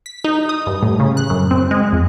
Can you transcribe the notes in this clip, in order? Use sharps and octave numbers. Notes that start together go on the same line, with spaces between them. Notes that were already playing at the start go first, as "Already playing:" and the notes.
B6
D#4
D#6
G2
A2
C#3
F#6
F#2
C4
G#3
F2